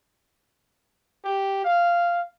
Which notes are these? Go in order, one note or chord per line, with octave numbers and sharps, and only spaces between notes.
G4
F5